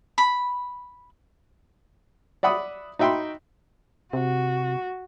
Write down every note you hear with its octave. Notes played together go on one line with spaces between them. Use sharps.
B5
D5 E5 F#5 B5 D#6
D#4 F#4 E5 G5 B5 C6
C3 F#4